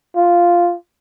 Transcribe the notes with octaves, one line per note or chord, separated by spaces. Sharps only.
F4